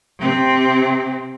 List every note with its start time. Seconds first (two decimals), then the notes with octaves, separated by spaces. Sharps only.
0.19 C3 C4